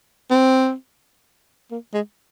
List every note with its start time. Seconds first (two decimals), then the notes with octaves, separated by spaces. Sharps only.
0.31 C4
1.71 A#3
1.94 G#3